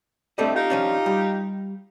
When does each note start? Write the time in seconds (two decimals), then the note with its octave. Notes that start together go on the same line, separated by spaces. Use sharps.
0.38 D3 G3 A3 C4 A4 D#5
0.54 D#4 F4 G4
0.70 F3 C#4 D4
1.06 G3